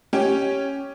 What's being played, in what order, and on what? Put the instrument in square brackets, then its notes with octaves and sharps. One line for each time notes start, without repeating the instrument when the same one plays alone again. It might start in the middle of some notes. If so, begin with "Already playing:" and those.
[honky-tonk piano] C#4 G4